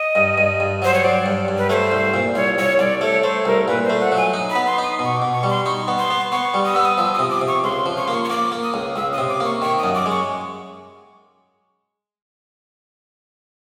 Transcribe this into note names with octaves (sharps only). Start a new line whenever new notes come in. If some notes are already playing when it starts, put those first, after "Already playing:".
Already playing: D#5
G2
G2
G2
F#3 C5
C#5
F#3 D5
G2
G2
B4
A3 C5 C#5
C2
A#2
C2 C#5
C2 C#5
C2 D5
A3 C#5
A3 C5
C2 A#4
A#2 B4
A3 C5
F#5
F#3
G#5
D#4
B5
B3
C6
D#4 D#6
B2
C#6
D6
B2
C#6
G3
C6
D#4 C#6
B3
C6
B3
B3 C#6
G3
D#6
B3 E6
D#6
F3 E6
C3 D#6
D6
C3
C#6
C#2 C6
F3
C#6
A#3 C6
C#6
C#6
A#3 D6
A#3
D#6
C#2
C#2 E6
D#6
C3
D6
A#3 C#6
D#3 C#6
F#2 D#6
D6
G#3
C#6